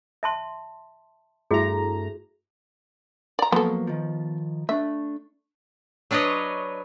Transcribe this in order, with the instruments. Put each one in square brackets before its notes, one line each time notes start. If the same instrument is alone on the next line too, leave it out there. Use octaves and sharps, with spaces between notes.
[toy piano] E5 A5 C6
[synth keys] G2 A3 A#5 [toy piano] E4 F#4 G#4
[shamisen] D5 A#5
[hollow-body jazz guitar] F3 F#3 A#3 [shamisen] B3 A4
[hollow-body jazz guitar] D#3 F3
[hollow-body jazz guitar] A3 D4 [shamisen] E5
[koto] F#3 D4 B4 C#5 D#5